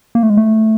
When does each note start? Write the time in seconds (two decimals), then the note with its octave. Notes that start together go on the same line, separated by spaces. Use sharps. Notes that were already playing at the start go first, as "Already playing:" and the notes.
0.15 A#3
0.23 A3
0.30 G#3
0.37 A3